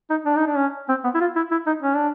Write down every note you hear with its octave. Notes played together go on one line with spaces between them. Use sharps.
D#4
D4
D#4
D4
C#4
C4
B3
E4
F4
E4
E4
D#4
C#4
D4